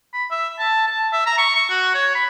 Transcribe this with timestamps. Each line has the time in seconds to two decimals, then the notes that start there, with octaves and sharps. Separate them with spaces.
0.13 B5
0.31 E5
0.59 A5
0.87 A5
1.12 E5
1.26 A#5
1.38 C#6
1.55 C#6
1.70 F#4
1.95 C#5
2.15 B5